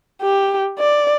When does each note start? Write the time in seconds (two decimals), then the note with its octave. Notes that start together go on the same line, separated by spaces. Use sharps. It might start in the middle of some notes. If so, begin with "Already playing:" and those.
0.21 G4
0.79 D5